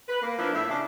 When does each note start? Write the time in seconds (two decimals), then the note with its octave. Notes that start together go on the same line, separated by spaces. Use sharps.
0.09 B4
0.22 A#3
0.38 F3 A#3 B3 D4 E4
0.54 A2 E5
0.70 C#3 D4